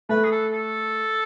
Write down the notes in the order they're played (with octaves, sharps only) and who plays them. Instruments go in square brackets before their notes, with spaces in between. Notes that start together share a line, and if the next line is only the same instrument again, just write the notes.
[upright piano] A3 [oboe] B4
[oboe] G#4
A4
A4